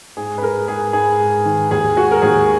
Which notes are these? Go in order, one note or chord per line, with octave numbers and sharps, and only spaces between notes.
G#2 G#4
B4
G#3 A#4
G#2 G#4
G#2 G#4
G#2
D#3
D#2 G#4
G#3 F#4
A#4
D#2 G#4